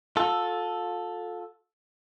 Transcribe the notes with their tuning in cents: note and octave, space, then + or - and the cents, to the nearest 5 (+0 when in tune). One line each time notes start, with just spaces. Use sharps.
F4 +35 A4 +0